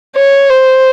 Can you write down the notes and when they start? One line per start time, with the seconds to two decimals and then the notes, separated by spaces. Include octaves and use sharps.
0.16 C#5
0.49 C5